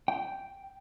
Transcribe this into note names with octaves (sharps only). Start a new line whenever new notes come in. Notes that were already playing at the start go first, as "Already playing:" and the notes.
G5